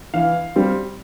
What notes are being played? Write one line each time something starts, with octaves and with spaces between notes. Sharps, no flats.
E3 F5
G3 C4